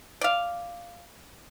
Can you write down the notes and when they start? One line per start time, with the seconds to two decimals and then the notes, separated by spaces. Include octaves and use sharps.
0.21 D5 F5